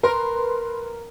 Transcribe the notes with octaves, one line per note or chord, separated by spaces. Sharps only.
A#4 B4 C6